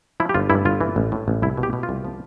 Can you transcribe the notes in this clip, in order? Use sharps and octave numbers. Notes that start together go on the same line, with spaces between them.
F3 E4
G4
G1 F4
G2 E4
G1 F4
E3
A1
A2
A1
C2 E4
B2
G4
B2
F4
C2
F3